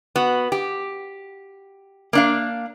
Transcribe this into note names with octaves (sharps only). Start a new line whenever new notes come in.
B3 F#4
G4
A#3 D4 F5